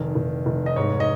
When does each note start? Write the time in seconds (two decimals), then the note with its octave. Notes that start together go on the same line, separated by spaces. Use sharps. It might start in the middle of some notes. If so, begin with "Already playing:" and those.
Already playing: F1 D#3
0.15 F1
0.46 F1
0.66 D#5
0.76 G#2 C#5
1.00 D#5